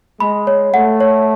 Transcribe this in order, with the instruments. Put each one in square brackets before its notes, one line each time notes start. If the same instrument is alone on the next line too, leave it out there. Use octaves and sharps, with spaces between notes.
[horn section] G#3 [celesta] B5
[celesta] C#5
[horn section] A3 [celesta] F#5
[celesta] C#5